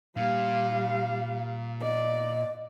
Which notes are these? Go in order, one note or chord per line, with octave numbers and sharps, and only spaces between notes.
A#2 G3 F5
D5 D#5